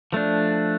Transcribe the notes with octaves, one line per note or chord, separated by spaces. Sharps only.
F3 A3 D4